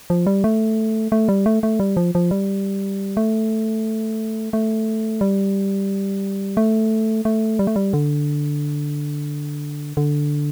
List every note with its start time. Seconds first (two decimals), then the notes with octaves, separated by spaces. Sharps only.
0.10 F3
0.26 G3
0.44 A3
1.12 A3
1.29 G3
1.46 A3
1.63 A3
1.80 G3
1.97 F3
2.15 F3
2.31 G3
3.17 A3
4.53 A3
5.21 G3
6.57 A3
7.25 A3
7.59 G3
7.67 A3
7.76 G3
7.93 D3
9.97 D3